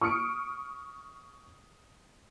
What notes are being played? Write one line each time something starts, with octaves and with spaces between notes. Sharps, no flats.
C#6 D#6 F6 C#7 D7